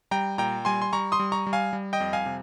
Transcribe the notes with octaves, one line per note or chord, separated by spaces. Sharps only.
G3 G5 A#5
A#2 G5 A#5
G3 G#5 C6
C6
G3 A#5 C#6
C6 D#6
G3
A#5 C#6
G3
F5 G#5
G3
D#5 G5
F2
F5 G#5
C3